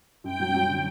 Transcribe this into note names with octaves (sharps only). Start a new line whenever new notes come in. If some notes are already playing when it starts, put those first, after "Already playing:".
F#2 G5
F#3
F#3
D3